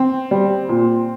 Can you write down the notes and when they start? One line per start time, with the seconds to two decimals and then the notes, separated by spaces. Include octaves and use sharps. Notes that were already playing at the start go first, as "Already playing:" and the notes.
Already playing: C4
0.31 G3
0.69 A#2